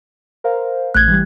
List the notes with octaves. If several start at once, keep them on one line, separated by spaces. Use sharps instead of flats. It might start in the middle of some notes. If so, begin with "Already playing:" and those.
A#4 C5 F5
A1 A3 F#6 G#6
E3 G3